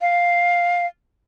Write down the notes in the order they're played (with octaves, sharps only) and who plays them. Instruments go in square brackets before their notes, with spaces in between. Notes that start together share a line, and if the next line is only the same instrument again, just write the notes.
[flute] F5